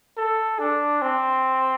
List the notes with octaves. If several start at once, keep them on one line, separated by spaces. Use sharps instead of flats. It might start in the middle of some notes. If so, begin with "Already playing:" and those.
A4
D4
C4